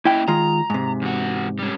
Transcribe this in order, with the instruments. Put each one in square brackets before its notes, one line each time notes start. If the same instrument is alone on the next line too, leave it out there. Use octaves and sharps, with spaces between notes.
[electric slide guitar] A#3 C#4 D#5 [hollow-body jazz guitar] E4 G5
[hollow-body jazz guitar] D#3 G#3 F4 [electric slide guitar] A#5
[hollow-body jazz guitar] G#2 C3
[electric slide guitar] E2 F#4
G3 C#4